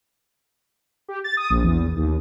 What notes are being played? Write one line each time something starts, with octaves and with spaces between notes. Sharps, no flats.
G4
A6
D#6
A#1
E2
D#2